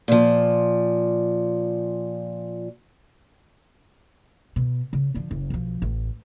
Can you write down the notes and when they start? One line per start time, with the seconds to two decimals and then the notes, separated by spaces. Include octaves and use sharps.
0.08 A#2 F3
4.56 B2
4.93 C#3
5.15 D3 F3
5.31 F#1
5.50 B1 F3
5.82 A1